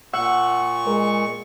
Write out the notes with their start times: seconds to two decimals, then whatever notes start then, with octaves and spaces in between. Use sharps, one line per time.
0.13 A#2 F#5 C#6 E6
0.87 G#3 A#4